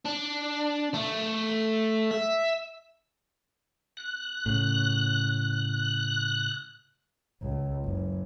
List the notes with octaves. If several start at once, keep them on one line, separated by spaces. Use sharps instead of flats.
D4
A3
E5
F#6
A2 C#3
C#2
F#1